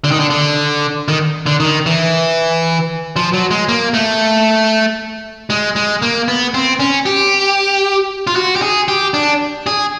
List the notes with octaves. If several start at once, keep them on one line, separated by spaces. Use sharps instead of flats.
D3
D#3
D3
D3
D#3
D3
D#3
E3
F3
F#3
G#3
A#3
A3
G#3
G#3
A#3
B3
C4
C#4
G4
F4
F#4
G4
G#4
G4
D4
G#4